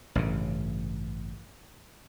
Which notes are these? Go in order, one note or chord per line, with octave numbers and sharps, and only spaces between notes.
A1 G2 C#3